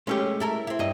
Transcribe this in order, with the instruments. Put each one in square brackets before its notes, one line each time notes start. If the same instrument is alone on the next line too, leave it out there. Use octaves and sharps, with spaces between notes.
[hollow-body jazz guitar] G#3 A3 G4 [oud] C#4
[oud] E4 A4 A#4
C4 E4
[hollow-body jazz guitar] G2 D#5